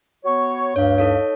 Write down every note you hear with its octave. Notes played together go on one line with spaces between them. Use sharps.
B3 F#4 C#5
D2 G2 C#5 F5
D#4 A4 C#5